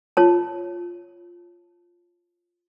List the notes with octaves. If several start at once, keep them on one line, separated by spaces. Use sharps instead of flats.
F4 C#5 A5